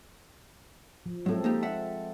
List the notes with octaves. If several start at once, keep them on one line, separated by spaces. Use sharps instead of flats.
F3
A2 F#3 G#3 C4 A4
A#3 D#4 G4
E5 F#5